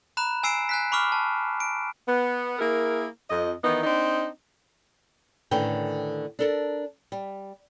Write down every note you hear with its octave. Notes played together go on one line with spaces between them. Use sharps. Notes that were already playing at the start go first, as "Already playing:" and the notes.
A#5 B5 F#6 E7
G#5 E6 C7 D7 E7
G#5 F#6 B6
B5 C#6 D6 F6
A5
D7
B3
A#3 E4 G#4 A#4
F2 D#5
D#3 E3 B3 D#4
C4 D4 D#4
A2 D3 D#3 C#4 B4 G5
D4 A4 A#4
G3